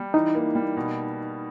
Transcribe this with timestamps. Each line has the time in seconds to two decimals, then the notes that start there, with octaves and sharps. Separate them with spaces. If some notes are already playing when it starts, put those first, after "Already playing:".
Already playing: G3
0.14 E3 D#4
0.35 A#3
0.55 G3
0.77 B2